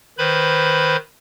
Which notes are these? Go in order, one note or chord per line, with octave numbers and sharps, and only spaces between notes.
D#3 B4 C5 B5